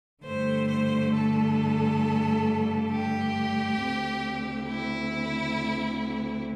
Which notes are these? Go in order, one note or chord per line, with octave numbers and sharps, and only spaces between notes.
G2 D3 A3 C5
C5
A4
G4
D2 D3 C4
E4